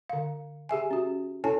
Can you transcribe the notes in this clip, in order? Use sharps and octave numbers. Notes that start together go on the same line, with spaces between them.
D3 F5
G4 G#4 E5 G#5
C#4 F#4
C#4 E4 A4 C#5 G#5 A5